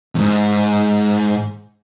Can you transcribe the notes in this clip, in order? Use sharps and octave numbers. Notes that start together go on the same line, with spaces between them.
F2 G#2